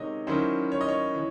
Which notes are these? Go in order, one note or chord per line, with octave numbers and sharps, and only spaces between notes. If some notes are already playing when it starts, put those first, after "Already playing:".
Already playing: C3 D#3 G#3 D#4 C#5 D#5
D#3 F#3 C#4 E4 C5
C#5
D#5
C#5
E3